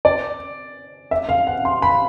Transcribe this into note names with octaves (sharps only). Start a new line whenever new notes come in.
D5
E5
F5
F#5
C6
B5